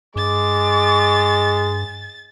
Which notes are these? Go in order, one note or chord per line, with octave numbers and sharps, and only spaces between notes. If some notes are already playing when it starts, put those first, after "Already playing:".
G2 G#3 D6 A6